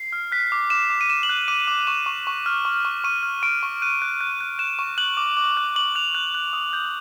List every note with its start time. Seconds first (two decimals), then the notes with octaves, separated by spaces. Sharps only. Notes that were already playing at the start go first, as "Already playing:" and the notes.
Already playing: C7
0.13 F6
0.32 F#6 B6
0.52 D6
0.70 D6 E7
0.90 D6
1.01 D#7
1.09 D6 E7
1.23 F#7
1.29 F#6
1.48 D6 D#7
1.68 D6
1.87 C#6 E7
2.06 C#6
2.27 C#6
2.46 F6
2.65 C#6
2.85 C#6
3.04 C#6 D#7
3.23 F6
3.43 C#6 D7
3.63 C#6
3.82 F#6 D#7
4.02 F#6
4.21 F#6
4.41 F#6
4.59 F#6 E7
4.79 C#6
4.98 F#6 F#7
5.17 D6
5.37 D6
5.57 F#6
5.76 D6 F#7
5.95 F#6 F7
6.15 F#6
6.35 F#6
6.53 D#6
6.73 G6